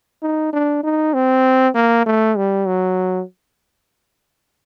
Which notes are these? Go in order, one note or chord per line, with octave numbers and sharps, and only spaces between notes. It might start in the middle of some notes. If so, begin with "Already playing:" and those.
D#4
D4
D#4
C4
A#3
A3
G3
F#3